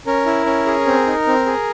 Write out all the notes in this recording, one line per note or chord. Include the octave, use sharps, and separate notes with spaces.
C#4 A#4
E4
C#4
G#4
C4
D#4
C4
G#4